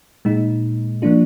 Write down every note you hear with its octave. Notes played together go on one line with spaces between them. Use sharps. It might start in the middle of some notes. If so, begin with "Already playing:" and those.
A#2 G#3 D#4
F3 A#3 D4 F4